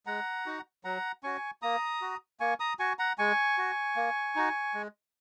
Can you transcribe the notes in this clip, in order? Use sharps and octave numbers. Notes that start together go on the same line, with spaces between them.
G#3 F#5 A#5
D#4 F#4
F#3 F#5 A#5
C#4 F#4 G#5 C#6
A#3 A#5 D#6
F#4
A#3 G#5 C#6
A#5 D#6
F#4 G#5 C#6
F#5 A#5
G#3 G#5 C#6
F#4
A#3
D#4 F#4
G#3